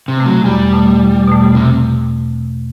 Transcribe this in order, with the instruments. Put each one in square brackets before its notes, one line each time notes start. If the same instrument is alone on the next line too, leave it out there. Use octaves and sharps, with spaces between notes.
[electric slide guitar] C3
[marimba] B2 A3
[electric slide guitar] F#3
[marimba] E2 [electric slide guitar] G3
[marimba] B2 A3
E2
B2 A3
[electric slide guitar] C3